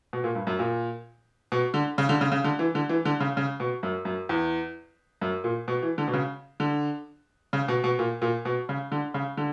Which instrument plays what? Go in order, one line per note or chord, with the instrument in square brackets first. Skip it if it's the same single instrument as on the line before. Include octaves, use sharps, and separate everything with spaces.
[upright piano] B2
A#2
G2
F#2
A#2
B2
D3
C#3
D3
C#3
C#3
D3
E3
D3
E3
D3
C#3
C#3
B2
F#2
F#2
E2
F#2
A#2
B2
E3
D3
B2
C#3
D3
C#3
B2
B2
A#2
A#2
B2
C#3
D3
C#3
D3